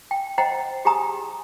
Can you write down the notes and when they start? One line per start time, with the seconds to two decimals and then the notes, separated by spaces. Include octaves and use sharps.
0.11 G5
0.38 C5 D#5 F#5 G5 A#5
0.85 G4 G#4 G#5 A#5 D#6